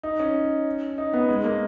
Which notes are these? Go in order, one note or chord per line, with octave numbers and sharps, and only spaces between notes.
D#4
C#4
D#4
B3
G#3
A#3